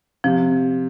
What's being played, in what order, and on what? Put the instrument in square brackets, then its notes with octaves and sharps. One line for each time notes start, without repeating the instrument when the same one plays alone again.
[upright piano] C3 [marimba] F3